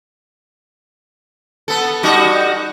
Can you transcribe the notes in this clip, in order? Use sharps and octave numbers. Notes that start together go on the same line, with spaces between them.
B3 A4
G3 D#4 F#4